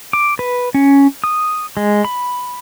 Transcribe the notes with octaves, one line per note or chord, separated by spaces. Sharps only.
D6
B4
C#4
D#6
G#3
B5